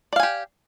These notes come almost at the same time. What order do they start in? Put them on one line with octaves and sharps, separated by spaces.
D5 F5 G#5 G4